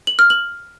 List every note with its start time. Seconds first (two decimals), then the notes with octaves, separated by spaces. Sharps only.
0.07 F#7
0.19 F6
0.30 F#7